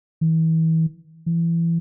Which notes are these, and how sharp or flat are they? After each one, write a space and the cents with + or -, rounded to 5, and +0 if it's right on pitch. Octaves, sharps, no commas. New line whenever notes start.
E3 -35
E3 +25